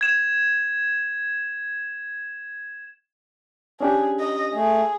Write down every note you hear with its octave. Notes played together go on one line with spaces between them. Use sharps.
G#6 E7
C#4 D4 G4 G#4
D#5
A3 G#4